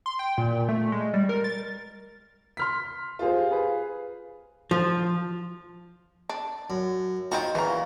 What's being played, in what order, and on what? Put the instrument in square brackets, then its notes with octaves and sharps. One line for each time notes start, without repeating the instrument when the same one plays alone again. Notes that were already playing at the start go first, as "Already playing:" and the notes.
[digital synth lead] C6
G5
A#2
A3
G#3
G3
A#4
A6
[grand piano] C6 F6 B6
F4 G4 G#4 C5
G#4 B4 F5
[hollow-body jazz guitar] F3
[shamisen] D4
[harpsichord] F#2
[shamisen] C4 D#4 F#4 [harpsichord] F4
[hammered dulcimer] A#2 F#4 F5 [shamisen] C#3 A#5 [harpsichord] E3